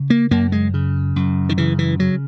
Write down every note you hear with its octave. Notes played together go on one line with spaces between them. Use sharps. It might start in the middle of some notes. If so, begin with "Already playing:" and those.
Already playing: C#3
A#3
F#2 A#3
G#3
C#3
F#2
D#3
C#3 E3
E3
C#3 F#3